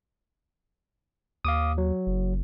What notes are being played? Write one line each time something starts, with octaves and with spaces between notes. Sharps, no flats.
D#2 F5 D6 D#6
F#3
F#1